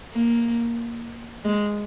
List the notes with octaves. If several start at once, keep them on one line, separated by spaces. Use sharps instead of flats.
A#3
G#3